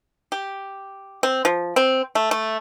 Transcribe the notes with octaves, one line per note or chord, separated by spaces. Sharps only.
G4
C4
F3
C4
A3
A3